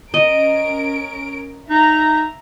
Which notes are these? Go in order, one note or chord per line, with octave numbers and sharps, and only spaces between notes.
C#4 A#4 D#5 D7
D#4 E5 A#5